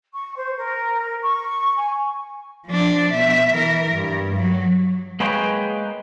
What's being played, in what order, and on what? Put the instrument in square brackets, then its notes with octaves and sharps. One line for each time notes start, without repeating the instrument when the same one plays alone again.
[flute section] C#6
C5
A#4
C#6
G#5
[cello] F3 D4
B2 E5
E3 A#4
G2
F#3
[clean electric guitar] G#3 A#3 G#4 B4 C#5 G5